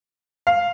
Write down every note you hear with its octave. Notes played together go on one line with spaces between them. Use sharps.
F5